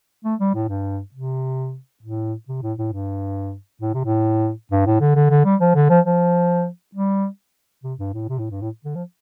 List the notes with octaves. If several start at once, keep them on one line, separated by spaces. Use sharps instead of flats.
A3
G3
A2
G2
C3
A2
C3
A2
A2
G2
A2
C3
A2
G2
A2
D3
D3
D3
G3
F3
D3
F3
F3
G3
C3
G2
A2
C3
A2
G2
A2
D3
F3